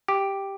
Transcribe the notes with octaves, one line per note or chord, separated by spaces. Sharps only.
G4